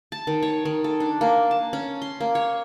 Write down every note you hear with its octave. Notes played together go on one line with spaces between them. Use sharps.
A5
D#3
C#5
D#3
A4
D4
A#3
A5
C#4
C6
A#3
C#5